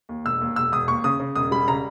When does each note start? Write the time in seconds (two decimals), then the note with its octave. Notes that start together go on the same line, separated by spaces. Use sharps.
0.09 D#2
0.25 E1 E6
0.41 D#2
0.56 E1 E6
0.72 E1 D#6
0.88 D#2 C#6
1.04 C#3 D#6
1.20 C#3
1.36 E1 D#6
1.51 G3 B5
1.68 C#3 A#5